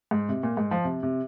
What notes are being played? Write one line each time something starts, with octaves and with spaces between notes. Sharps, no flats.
G#2
C3
A#2
G#2
F3
C3
C3